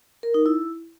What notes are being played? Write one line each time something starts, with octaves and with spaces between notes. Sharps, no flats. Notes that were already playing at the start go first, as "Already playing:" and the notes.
A#4
D#4
E4